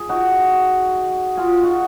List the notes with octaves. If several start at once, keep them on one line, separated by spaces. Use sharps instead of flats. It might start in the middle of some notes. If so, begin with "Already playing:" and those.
Already playing: G#4
D#4 F#4
F4 G#4
D#4 F#4